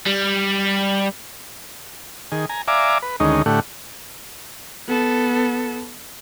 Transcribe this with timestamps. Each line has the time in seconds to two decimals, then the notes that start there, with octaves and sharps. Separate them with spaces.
0.07 G3
2.32 D#3 G#4
2.49 G#5 A#5
2.68 D5 E5 F5 G#5 A#5 D6
3.02 B4
3.20 D2 D#3 G#3 C#4 D#4
3.46 A2 D3 A3 G4 F#5
4.87 B3 A4